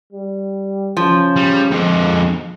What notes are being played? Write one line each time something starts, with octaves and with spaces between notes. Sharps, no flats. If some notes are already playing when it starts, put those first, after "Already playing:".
G3
C#3 F3
G3
F2 D3 G#3